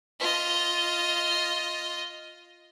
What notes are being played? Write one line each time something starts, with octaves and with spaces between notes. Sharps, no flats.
F4 D#5